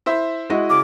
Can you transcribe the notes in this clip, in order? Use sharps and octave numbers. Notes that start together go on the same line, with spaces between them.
E4 C5 E5
G#3 E4 F#4 D#5
C#3 D6